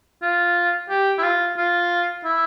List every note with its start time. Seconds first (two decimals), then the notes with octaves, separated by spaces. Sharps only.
0.22 F4
0.90 G4
1.18 E4
1.23 F4
1.57 F4
2.24 E4